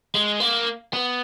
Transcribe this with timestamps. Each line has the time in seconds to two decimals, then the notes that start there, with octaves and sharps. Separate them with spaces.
0.15 G#3
0.40 A#3
0.93 B3